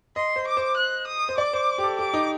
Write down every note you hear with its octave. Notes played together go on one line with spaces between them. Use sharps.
D#5 C6
C5
D6
C5
F#6
D#6
C5
D5 D6
C5
G4
A4
G4 D6
D#4